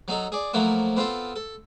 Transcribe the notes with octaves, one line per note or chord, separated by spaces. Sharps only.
F#3 D#4 A4
G#4 D5
F3 F#3 A3 A#3 E4 F#4
B3 C4 F4 A4 C5
A4